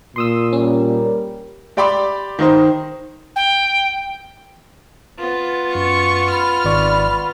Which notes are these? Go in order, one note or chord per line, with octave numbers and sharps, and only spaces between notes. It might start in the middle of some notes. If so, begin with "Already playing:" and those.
A#2 C6 D#6 E6
G3 C#4 A#4
G4 D5 G5 B5 C6 D6
D#3 D#4 C5
G5
B3 F4
F#2 C#6
B5 F6
G#1 D5 C#6